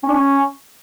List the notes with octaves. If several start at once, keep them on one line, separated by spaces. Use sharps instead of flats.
C#4
D4
C#4